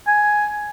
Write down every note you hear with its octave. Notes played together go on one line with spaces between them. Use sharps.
G#5